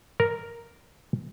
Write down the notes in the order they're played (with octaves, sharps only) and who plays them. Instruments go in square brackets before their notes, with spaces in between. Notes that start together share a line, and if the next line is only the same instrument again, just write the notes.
[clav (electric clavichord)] A#4